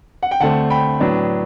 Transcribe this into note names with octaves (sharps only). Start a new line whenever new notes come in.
F#5
G5
D2 D3 A3 C4 F#5 A5
G5 B5
A2 F#3 B3 D4